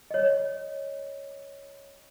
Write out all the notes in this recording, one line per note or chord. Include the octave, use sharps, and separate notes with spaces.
C#5 D#5